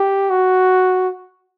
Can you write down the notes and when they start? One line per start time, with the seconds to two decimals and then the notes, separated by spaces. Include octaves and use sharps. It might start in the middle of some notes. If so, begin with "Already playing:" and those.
Already playing: G4
0.30 F#4